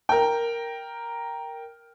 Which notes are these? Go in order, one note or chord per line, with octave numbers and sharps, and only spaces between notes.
A#4 G5